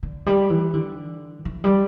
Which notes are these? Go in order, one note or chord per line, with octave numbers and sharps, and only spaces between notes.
D3
G3
E3
D3
E3
G3